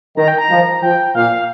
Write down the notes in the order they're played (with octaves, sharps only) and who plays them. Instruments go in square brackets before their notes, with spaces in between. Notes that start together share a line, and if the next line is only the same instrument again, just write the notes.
[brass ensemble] D#3 [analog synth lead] A#5
[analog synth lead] G5
A#5
[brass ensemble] F3
[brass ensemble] F3 [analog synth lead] G5
[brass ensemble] A#2 [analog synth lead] F5